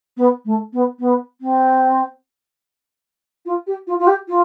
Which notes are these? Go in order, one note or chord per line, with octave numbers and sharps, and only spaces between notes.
B3
A3
B3
B3
C4
F4
G4
F4
F4
G4
F4